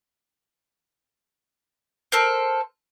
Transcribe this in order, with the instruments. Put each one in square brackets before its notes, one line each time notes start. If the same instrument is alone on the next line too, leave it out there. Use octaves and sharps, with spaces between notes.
[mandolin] A4 A#4 C5